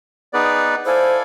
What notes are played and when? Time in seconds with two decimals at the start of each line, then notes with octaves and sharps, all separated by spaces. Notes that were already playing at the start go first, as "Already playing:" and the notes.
0.33 B3 D#4 G#4 B4 D5
0.85 E4 A4 C5 D5 F5 G#5